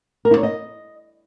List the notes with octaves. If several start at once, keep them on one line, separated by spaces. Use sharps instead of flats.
A#4
E4
C#5
D#5